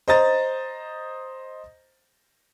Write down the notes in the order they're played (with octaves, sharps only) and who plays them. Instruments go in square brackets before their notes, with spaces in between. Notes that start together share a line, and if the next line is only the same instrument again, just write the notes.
[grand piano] C5 D#5 A#5 A6